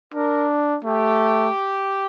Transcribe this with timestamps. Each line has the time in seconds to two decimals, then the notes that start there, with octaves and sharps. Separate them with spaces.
0.14 D4 A#4
0.85 A3 G4